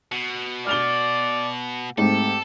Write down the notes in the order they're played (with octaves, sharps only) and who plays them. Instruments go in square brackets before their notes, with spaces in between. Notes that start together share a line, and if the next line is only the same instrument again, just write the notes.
[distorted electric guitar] B2
[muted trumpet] D5 [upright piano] F6 F7 G7
[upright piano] G#2 A3 C4 [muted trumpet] G4 [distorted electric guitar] A4